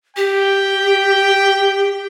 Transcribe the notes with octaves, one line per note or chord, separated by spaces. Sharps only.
G4 G5